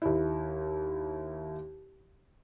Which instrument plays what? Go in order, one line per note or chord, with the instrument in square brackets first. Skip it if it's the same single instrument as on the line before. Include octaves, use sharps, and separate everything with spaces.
[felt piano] D#2 E4